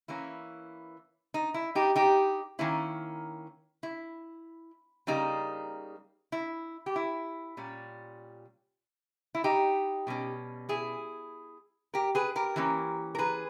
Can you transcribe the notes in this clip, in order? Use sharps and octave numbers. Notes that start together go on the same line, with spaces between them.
E3 A#3 C#4 E4
D#4
E4
D#4 G4
D#4 G4
D#3 A#3 C#4 E4
E4
C#3 G3 A#3 D#4
E4
G4
E4
A#2 G3 C#4
E4
D#4 G4
B2 G3 C#4
E4 G#4
G4 A#4
G#4 B4
G4 A#4
E3 A#3 C#4
A#4
G#4 B4